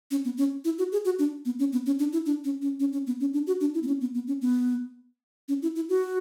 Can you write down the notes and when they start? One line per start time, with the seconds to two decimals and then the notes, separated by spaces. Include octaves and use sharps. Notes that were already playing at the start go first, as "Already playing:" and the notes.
0.11 C#4
0.25 B3
0.37 C#4
0.65 E4
0.78 F#4
0.92 G#4
1.05 F#4
1.19 D4
1.45 B3
1.59 C#4
1.72 B3
1.86 C#4
1.99 D4
2.13 E4
2.26 D4
2.44 C#4
2.62 C#4
2.80 C#4
2.93 C#4
3.07 B3
3.20 C#4
3.33 D4
3.47 F#4
3.61 D4
3.74 E4
3.83 B3
3.87 C#4
4.01 B3
4.14 B3
4.27 C#4
4.41 B3
5.48 C#4
5.62 E4
5.76 E4
5.89 F#4